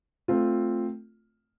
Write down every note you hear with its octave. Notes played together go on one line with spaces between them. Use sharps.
A3 C4 F4